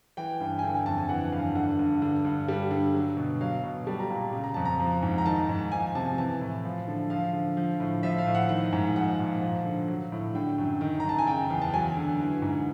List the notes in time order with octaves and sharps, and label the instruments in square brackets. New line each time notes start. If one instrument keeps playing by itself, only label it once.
[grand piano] E3 G5
G2
G#5
D3 G5
G#5
F2 A5
G#5
E3 F#5
G2 F5
D3 F#5
G2
D3
G2
G3
D3
F#3
B2
F#3 F5
B2
G3 A5
A#5
A#2 A5
C#3
A#5
F2 A5
A#5
F3
G#2
A#5
D#3 A5
G#2
F3 G#5
C3 A5
E3 A5
A2
F3
D3
F3 F5
D3
F3
A2
F3 E5
F5
A2
F#5
D#3 F#5
G#2
F3 F#5
A#2
F3
D3
F#3
A2
D3 G5
F#2
D#3
A#5
F#2 A5
G#5
C#3 G5
E2
A5
F#3 G#5
D3
E3
G#2